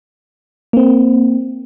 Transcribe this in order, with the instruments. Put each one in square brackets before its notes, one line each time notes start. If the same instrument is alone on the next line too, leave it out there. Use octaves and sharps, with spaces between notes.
[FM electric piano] A#3 C4